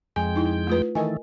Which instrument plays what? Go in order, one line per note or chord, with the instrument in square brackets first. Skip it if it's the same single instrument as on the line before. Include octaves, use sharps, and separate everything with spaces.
[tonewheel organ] F2 G#3 G5 [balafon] G#5
[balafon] D#4 E4
A3 F4 B4
[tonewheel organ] D#3 E3 A3 [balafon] A#4 D#5 G#5